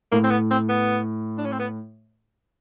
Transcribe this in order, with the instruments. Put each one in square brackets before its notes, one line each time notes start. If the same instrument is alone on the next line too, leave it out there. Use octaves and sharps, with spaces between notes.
[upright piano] A2 [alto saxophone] A#3
[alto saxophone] C4
B3
C4
B3
D4
C#4
C4
B3